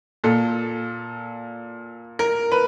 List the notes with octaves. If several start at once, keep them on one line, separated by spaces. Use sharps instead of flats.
A#2 A4
A#4
B4